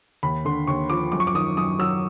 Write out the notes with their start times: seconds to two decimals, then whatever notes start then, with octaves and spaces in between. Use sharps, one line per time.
0.23 D#2 B5
0.45 D3 C6
0.67 D#2 C#6
0.90 F3 D6
1.12 F#2 D6
1.20 C#6
1.27 D6
1.34 D#3 D#6
1.57 F#2 D#6
1.79 F#3 E6